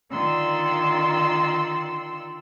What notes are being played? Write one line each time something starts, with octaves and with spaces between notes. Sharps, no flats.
D3 D#3 F4 D5 C6 E6